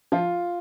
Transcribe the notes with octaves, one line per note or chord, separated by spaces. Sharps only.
F3 F4